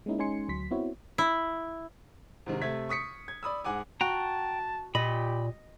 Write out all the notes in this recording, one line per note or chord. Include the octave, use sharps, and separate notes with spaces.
G#3 A#3 C#4 D#4 E4
G#3 C#4 D#4 G#5 C6 C#7
D2 F#3 C6 B6
B3 C4 E4 F#4 C#5
E4
G#2 C3 D#3
C3 A3 E5 G#6 B6
C#6 D#6 B6 C#7
G#6
D5 B5 D#6 E6
G#2 F#5 G#5 D6
F#4 G5 A5 A#5
A#2 G4 D#5 B5